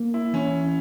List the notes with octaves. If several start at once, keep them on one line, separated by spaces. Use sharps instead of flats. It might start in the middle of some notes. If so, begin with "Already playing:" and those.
Already playing: A#3
E4
E3 C#4